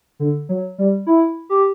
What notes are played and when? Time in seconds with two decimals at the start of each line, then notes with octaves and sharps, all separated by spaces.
0.20 D3
0.49 F#3
0.78 G3
1.07 E4
1.49 G4